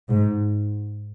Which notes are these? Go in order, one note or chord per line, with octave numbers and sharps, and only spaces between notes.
G#2